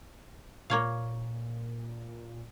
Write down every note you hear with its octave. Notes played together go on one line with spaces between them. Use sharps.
A#2 A#3 C#5 F5